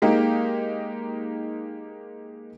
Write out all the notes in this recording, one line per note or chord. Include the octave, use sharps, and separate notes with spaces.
G#3 A#3 D#4 G4